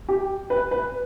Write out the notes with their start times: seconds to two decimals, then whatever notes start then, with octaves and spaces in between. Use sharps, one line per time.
0.09 G4
0.50 B4
0.71 B4